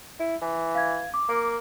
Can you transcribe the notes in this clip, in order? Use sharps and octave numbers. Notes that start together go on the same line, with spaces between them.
E4
E3
F5 G#6
D6
A#3